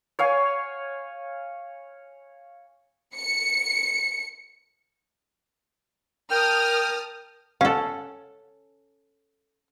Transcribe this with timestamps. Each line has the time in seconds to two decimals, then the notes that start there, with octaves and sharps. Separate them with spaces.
0.19 C#5 F5 G#5
3.16 C#7
6.31 A#4 G5 A5 D#6 F6
7.61 C#4 A4 F5 F#5